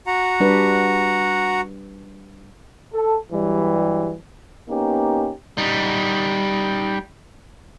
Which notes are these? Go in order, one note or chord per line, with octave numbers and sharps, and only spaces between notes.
F#4 F#5 A#5
G3 D4 B4
A4
G2 E3 F#3 G3
A#3 B3 C#4 D#4 G4
G3 D#4